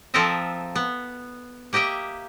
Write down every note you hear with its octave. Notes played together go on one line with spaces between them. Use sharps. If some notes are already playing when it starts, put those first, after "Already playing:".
F3 C4 A4 A#4 D#5 E5
B3
A#3 G4 D#5 E5 G5